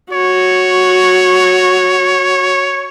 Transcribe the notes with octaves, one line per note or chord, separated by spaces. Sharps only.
F#4 C#5